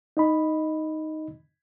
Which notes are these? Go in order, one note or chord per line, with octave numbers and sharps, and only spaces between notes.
D#4 D#5 B5